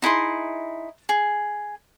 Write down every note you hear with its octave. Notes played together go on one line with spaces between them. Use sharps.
D#4 E4 G#4 C6
G#4